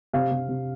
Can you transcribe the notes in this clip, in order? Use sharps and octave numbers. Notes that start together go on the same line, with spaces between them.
C3 F5
C3
C3